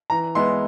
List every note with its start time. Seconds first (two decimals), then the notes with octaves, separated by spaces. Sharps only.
0.10 E3 A#5
0.35 G#3 B3 E4 C6